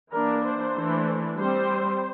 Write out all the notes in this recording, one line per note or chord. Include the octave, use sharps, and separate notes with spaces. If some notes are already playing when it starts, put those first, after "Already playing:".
E3 A#3 D4 A#4
C5
E3 A3 D4
G3 C4 C5